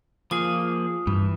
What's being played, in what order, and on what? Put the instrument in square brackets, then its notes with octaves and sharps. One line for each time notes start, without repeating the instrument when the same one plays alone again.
[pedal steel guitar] F3 A#3 G#4 [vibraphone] F4 D#6
[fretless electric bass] G2 [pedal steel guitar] E3